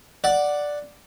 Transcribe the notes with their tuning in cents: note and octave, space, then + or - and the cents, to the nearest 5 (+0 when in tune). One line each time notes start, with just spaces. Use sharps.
D5 +0 F#5 +0